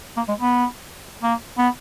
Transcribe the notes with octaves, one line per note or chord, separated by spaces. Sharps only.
A#3
G#3
B3
A#3
B3